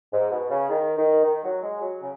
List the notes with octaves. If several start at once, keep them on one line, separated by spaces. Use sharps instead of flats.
G#2
B2
C#3
D#3
D#3
D#3
F#3
G#3
F#3
C#3